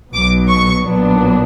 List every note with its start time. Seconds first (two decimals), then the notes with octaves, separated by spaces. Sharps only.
0.13 B1 B2 F#3 B3 D6
0.49 C#6
0.84 B1 A#2 F#3 B3 D4